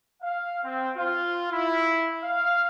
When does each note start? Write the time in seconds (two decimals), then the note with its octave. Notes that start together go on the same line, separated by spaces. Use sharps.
0.21 F5
0.64 C4
0.96 F4
1.51 E4
2.22 F5